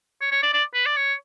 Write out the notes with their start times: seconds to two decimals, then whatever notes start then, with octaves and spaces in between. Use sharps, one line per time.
0.21 C#5
0.31 C#5
0.42 D5
0.53 D5
0.74 B4
0.86 D5
0.96 C#5